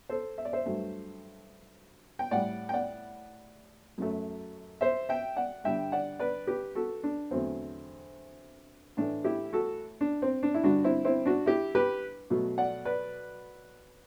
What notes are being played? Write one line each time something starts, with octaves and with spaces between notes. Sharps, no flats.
A4 C5
E5
D5
C5 E5
G2 F#3 A3
G5
A2 G3 D5 F#5
G5
D5 F#5
F#2 F#3 A3
C5 E5
E5 G5
D5 F#5
G2 D3 G3 E5 G5
D5 F#5
B4 D5
G4 B4
F#4 A4
D4
E2 D3 F#3 A3 C4
A2 E3 A3 D4
E4 G4
F#4 A4
D4
C4
D4
E4
G2 D3 G3 D4 F#4
C4 E4
C4 E4
D4 F#4
E4 G4
G4 B4
B2 F#3 A3
D5 F#5
B4 D5